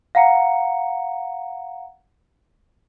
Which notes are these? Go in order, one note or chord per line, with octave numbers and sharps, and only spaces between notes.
F5 F#5 A#5 C#7